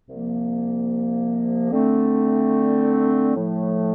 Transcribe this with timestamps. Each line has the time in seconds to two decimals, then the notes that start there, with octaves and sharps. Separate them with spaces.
0.07 C2 C3 F3 A#3
1.71 D3 A3 C4
3.35 A2 F3 A3